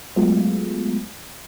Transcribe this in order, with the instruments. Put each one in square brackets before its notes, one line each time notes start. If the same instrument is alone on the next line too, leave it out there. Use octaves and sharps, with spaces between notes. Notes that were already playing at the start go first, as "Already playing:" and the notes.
[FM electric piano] F#3 G#3 A3 B3 F4